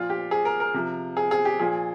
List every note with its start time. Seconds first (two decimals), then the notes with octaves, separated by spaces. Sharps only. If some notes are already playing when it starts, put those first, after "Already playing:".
Already playing: A#2 F3 F4
0.10 G4
0.31 G#4
0.45 A#4
0.60 A#4
0.74 C3 F3
1.17 G#4
1.31 G#4
1.45 G4
1.59 A#2 F3 G#4